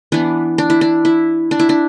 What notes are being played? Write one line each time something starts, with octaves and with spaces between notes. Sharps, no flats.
E3 B3 D4
D4
E4
D4
E4
D4
E4
D4